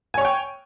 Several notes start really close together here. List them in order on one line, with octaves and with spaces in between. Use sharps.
G#5 C#5 C#6 G5